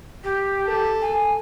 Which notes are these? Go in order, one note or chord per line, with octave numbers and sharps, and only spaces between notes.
G4
A4
G#5